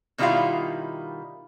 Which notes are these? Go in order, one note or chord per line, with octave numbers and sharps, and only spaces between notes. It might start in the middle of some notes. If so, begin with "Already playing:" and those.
B2 D#3 G3 E4 F4 F5